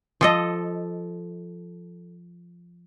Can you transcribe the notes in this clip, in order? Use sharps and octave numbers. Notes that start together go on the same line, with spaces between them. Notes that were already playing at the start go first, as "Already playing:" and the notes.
F3 A4 D#5